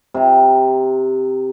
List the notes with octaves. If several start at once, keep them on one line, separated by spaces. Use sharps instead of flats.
C3 A#5